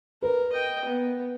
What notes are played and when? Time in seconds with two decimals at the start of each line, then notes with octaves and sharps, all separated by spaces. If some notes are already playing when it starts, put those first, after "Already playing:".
0.22 A#4 B4
0.52 D#5 G5
0.85 B3